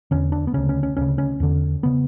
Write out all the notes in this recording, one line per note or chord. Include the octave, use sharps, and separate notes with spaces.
E2 D3 C#4
D4
B3
D2 C#3 C#4
C#4
C#4
D2 C#3 C#4
C#4
E2 D3
C#3 B3